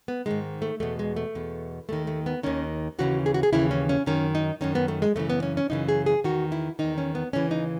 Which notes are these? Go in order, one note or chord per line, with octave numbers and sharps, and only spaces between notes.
B3
G#2 D#3 G#3
A3
E2 B2 A3
G#3
A3
E2 B2
D#2 D#3 A3
A3
B3
D#2 D#3 C#4
D#2 C#3 E3 F#4
G#4
F#4
G#4
D#2 C#3 E3 E4
C#4
C#4
F#2 D#3 C#4
D#4
F#2 D#3 C#4
B3
A3
G#3
F#2 C#3 E3 A3
B3
C#4
C#4
F#2 C#3 E3 D#4
G#4
G#4
E2 D#3 F#4
E4
E2 D#3 D#4
C#4
B3
D#2 C#3 E3 C#4
D#4